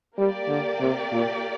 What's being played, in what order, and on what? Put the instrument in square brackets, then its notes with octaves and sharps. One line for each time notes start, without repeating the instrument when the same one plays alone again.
[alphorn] G3 [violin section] A#3 G4 D5
[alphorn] D3
C3
A#2